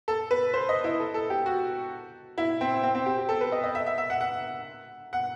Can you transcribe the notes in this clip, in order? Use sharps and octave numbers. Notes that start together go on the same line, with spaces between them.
A4
B4
C5
D#5
E4
A4
A4
G4
F#4
E4
C4
C4
C4
G4
G4
A4
B4
D#5
D#5
E5
E5
E5
F#5
F#5
F#5